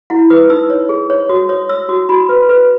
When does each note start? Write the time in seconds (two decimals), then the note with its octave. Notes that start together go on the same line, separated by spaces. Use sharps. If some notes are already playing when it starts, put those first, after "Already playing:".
0.10 E4 F#5
0.30 B4 D#6
0.50 D#4 E6
0.70 C#5
0.89 G#4
1.10 C#5
1.29 F#4 D#6
1.49 C#5 D#6
1.69 C#5 E6
1.89 F#4 D#6
2.09 F#4 B5
2.29 B4
2.49 B4